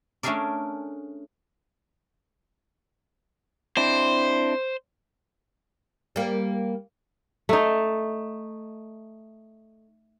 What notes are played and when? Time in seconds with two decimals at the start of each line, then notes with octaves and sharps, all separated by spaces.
0.23 A3 C#4 D4 G#4 A#4 D5
3.77 C4 D4 E4 C5
6.16 G3 A#3
7.49 A3 D#4